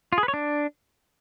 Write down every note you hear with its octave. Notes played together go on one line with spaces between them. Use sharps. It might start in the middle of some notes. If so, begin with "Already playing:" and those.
F4
G#4
B4
C#5
D4